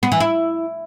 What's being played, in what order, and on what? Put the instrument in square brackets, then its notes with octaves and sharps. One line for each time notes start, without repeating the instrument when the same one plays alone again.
[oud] B3
E3
E4